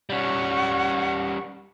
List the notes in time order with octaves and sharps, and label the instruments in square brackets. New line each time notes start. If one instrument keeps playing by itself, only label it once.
[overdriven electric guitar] G3 C#4 [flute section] F#5 C#6